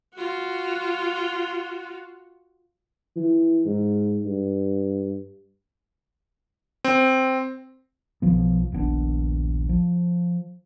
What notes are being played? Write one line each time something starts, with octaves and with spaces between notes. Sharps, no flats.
F4 F#4
E3
G#2
G2
C4
B1 F3 B3
D#1 A#1 B3 D4
F3